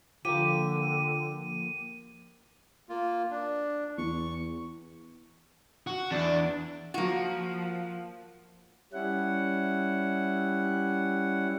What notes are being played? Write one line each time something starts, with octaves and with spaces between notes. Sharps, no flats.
D3 F3 A#3 G4 D#7
A#3 F4
D4
E2 C#6
F#4
E2 D4
F3 A#3 F#4
G3 C#4 E4 F#5